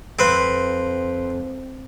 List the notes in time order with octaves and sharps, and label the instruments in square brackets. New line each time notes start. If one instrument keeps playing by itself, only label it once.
[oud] F2 [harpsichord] C4 B4